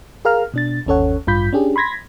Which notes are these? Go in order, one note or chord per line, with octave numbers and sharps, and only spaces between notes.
G#4 A#4 F5 A#5 F6
B2 D4 A6
G1 D#2 C#4 A4 C#5 F#5
A1 G2 F4 B5 G6 B6
C#4 D4 G4 G#4
B5 C6 G#6 A#6 B6